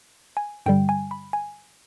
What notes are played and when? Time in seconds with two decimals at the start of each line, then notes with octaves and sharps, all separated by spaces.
0.37 G#5
0.66 G2 D3 G3 G5
0.89 G#5
1.11 B5
1.33 G#5